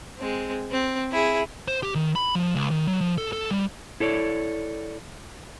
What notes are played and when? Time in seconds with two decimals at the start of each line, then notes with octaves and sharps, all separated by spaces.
0.19 G#3 C4
0.71 C4
1.12 E4 G#4
1.68 C5
1.83 G4
1.95 D#3
2.16 B5
2.35 F3
2.55 C#2
2.71 D#3
2.88 F#3
3.01 F3
3.18 A4
3.33 A4
3.51 G3
4.00 E4 A4 C#5 D5